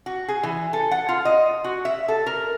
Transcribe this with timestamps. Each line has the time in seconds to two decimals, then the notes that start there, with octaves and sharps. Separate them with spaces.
0.06 F#4
0.28 G#4
0.43 E3
0.73 A4
0.91 F#5
1.09 F4
1.25 D#5
1.64 F#4
1.85 E5
2.08 A4
2.26 A#4